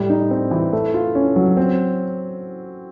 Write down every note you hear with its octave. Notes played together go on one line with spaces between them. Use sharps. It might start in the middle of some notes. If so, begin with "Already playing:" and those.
Already playing: A2 G3
D#4
C4
E3
A3
F4
C#4
F#3
C4